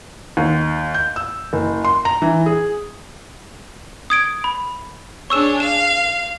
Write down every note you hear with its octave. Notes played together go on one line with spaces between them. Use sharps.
D#2
G6
E6
F#1
C6
A#5
E3
G#4
D#6 G#6 D7
B5
D4 G#4 C#5 C#6 E6 E7
F5 E7